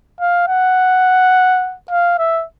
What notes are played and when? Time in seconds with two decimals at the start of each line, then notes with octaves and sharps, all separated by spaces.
0.20 F5
0.48 F#5
1.91 F5
2.18 E5